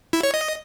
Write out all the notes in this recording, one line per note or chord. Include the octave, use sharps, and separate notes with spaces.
E4
C#5
D#5